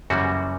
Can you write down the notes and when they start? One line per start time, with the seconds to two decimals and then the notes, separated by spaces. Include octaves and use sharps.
0.10 F#2 C#3 E3 G3 A#3 F#4